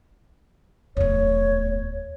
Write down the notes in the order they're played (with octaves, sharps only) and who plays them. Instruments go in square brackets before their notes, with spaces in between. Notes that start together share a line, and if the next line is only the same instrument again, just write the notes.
[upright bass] D1 E2 [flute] C#5